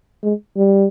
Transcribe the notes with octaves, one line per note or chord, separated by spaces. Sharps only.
G#3
G3